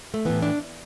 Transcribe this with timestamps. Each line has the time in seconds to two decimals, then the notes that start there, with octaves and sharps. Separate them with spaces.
0.14 A3
0.25 A2 E3 B3
0.42 D4